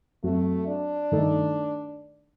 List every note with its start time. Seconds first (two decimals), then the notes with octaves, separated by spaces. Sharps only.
0.23 F#2 F#3 A3 C4 F#4
0.67 D4
1.11 G2 D#3 A3 D#4 A4